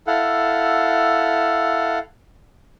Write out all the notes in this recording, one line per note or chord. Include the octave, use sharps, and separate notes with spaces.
E4 A4 F5 F#5